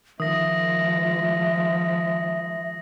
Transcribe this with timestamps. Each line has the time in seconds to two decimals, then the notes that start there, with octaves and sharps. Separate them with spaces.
0.20 D#3 F3 G#3 E5 D#6 A#6